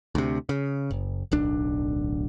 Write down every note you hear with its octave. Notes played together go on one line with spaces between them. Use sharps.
D2 C3
C#3
F#1
D1 B1 D4